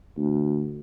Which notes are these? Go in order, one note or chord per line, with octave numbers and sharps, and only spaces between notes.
D2